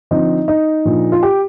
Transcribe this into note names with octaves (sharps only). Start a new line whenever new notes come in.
D3 F3 C4 D#4
D#4
A#2 F3 A#3 D4
F4
G4